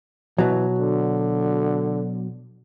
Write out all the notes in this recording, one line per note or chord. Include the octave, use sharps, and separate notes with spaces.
B2 E3 F#3
D3